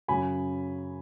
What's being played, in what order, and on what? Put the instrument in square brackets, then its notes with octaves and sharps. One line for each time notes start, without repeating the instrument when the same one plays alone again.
[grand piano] F#2 C#3 F#3 G#5 B5